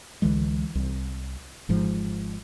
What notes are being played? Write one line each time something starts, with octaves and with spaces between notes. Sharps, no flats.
C#2 D3 E3 G#3
C2
G#1 G#2 F3